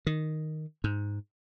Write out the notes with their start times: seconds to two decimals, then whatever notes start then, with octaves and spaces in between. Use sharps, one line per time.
0.07 D#3
0.84 G#2